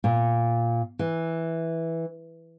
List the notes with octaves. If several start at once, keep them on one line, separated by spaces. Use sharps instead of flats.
A#2
E3